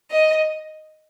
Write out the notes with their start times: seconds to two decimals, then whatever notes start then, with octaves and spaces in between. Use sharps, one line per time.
0.10 D#5